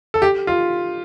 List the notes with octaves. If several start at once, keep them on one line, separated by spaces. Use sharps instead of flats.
A4
G4
F4